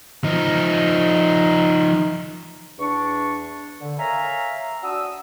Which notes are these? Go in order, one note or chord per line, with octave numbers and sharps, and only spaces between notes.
F3 D#4
E2 D4 C#6
D3
A#4 C#5 E5 F5 G#5 A#5
D4 F#4 D#6 E6